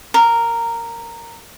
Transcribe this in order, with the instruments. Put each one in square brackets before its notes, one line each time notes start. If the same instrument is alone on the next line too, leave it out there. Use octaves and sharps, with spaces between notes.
[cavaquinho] A#4